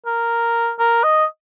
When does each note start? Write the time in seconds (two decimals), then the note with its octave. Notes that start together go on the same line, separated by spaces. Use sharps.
0.06 A#4
0.79 A#4
1.03 D#5